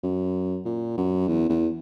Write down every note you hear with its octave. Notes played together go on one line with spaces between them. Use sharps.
F#2
A#2
F#2
E2
E2